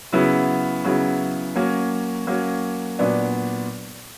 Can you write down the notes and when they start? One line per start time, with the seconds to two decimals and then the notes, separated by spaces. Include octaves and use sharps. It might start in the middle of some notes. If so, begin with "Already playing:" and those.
0.12 C#3 F#3 B3 E4
0.84 C#3 F#3 B3 E4
1.56 F#3 A#3 C#4
2.27 F#3 A#3 C#4
2.99 A#2 F#3 B3 D4